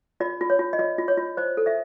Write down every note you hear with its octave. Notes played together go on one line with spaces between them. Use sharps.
F4 D5
F4
C#5
F4
D#5
F4 D5
F4
C#5
F4
C5 D5
A4
D5 E5